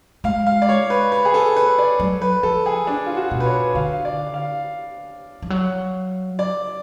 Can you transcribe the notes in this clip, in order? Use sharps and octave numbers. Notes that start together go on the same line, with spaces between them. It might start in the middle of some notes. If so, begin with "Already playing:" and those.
G#3 F5
F5
D5
C#5
B4
B4
G#4
A4
B4
D5
F#3
B4
F3 A4
G#4
D4
F4
F#4
B2
B4
C#5
D3 F5
F5
D5
F5
F3
F#3
D5